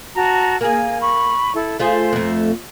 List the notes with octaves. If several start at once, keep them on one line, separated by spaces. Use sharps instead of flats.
F#4 A5 A#5
A#3 G#4 G#5
B5 C#6
E4 A4
A3 F4 G#4 C5
F2 A3